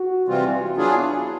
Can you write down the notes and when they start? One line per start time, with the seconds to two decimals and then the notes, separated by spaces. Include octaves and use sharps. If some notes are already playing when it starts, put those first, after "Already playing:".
Already playing: F#4
0.28 C3 E3 G3 C4 F4
0.77 F#3 B3 D4 E4 F4 G#4